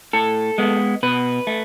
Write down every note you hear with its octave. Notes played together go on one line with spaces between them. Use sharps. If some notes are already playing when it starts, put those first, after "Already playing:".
A2 A4
G#3 B3
B2 B4
A3